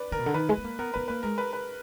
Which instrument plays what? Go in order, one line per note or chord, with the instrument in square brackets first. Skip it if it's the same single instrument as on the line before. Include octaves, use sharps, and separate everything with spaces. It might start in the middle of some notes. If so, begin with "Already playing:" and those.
Already playing: [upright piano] B4 D5
[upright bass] D3 [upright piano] A#4
[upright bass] B2
D3
[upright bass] D#3 [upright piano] B4
[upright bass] G#3
B3
A#3
[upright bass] B3 [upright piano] A#4
[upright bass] B3 [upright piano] B4
[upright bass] A#3 [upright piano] B4
[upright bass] G#3 [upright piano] A#4
[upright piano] B4
B4